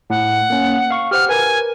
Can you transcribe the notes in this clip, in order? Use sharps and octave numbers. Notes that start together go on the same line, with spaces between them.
A2 F#5
A#3 C#4
F5 C#6
G4 C5 F#5 F6
A#4 B4 G#5